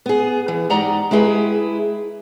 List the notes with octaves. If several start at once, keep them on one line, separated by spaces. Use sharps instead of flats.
B3 G#4
E3
G#2 G4 D5 D#5 F#5 A#5
G#3 E4 G4 G#4 B4